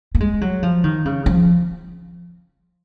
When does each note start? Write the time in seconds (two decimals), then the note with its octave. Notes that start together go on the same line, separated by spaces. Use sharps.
0.15 A#3
0.20 G#3
0.41 F#3
0.63 F3
0.84 D#3
1.05 C#3
1.26 F3